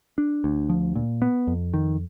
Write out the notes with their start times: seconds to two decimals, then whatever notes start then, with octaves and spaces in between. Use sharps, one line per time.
0.18 D4
0.44 D2
0.69 F3
0.95 A#2
1.22 B3
1.47 F2
1.74 D#3